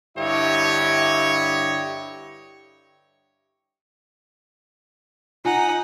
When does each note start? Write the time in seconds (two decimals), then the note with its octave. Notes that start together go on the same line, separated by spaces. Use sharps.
0.17 G2 D3 E4 G4 C#5 D#5
5.45 D#4 F4 F#5 G#5